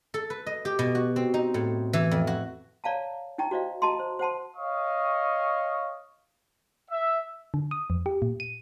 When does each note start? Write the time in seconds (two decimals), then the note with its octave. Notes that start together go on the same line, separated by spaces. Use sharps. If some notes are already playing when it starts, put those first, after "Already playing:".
0.14 A4
0.30 B4
0.46 D#5
0.65 G4
0.79 B2
0.95 F#4
1.16 C4
1.34 D#4
1.54 A2
1.93 E3
2.11 F2
2.27 F#4
2.84 C#5 D5 F5 A5 A#5
3.38 D#4 E4 G5 A#5 C#6
3.51 F#4 C5 D5 D#5 F5
3.82 F#4 D#5 A5 A#5 C6
3.99 C5
4.19 C5 F#5 A5 C6
4.57 C#5 D#5 F5 C#6 D#6
6.91 E5
7.54 D3
7.71 D#6
7.90 F2
8.06 G4
8.22 A#2
8.40 D#7